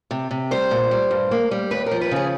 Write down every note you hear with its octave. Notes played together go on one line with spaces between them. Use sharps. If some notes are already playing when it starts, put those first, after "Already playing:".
C3
C3
G3 C5
A#2
G3
G2
A#3
G3
D#2 B4
A#4
F3
B4
C#3 G#4